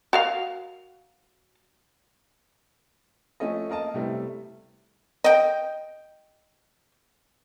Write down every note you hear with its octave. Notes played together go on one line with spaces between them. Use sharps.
F#4 A#4 F5
F3 A3 C#4 A4 D#5
A#3 A#4 D#5 A5
C3 G3 A3 B3 E4
D#5 G5